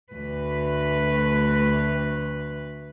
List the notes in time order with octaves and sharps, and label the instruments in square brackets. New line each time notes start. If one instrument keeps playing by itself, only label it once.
[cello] D2 B4